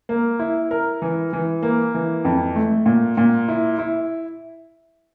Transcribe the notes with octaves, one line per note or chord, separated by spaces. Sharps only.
A#3
E4
A#4
E3
E3
A#3
E3
F2
A3
A#2
A#2
E4
E4